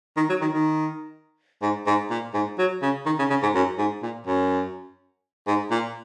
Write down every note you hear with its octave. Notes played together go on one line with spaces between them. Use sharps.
D#3
F#3
D#3
D#3
G#2
G#2
A#2
G#2
F#3
C#3
D#3
C#3
C#3
G#2
F#2
G#2
A#2
F#2
G#2
A#2